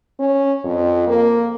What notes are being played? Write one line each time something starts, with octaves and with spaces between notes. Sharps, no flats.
C#4
F2
A#3